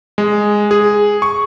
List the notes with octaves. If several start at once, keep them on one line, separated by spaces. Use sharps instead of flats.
G#3
G#4
C#6